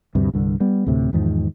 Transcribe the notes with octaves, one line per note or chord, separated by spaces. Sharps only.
D2 G2 C3
C2 G2 D3
G3 B3
D2 A2 C3
E2 G#2 D#3 F3